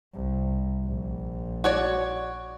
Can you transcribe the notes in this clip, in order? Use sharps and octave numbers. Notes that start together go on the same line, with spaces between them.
C2
A#1
F#4 C#5 D5